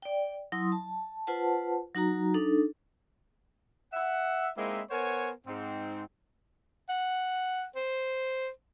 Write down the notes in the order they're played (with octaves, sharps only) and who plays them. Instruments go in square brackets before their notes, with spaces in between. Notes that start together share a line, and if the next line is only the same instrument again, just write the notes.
[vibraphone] D5 G5
F#3 E4 C6 D#6
A5
F4 B4 C5 F#5 A5
F#3 D#4 F#4 A#5
D4 D#4 A4
[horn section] E5 F#5
G#3 A#3 C4 D#4 E4
B3 A#4 C5 C#5 F#5 G#5
G#2 C4
[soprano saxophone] F#5
C5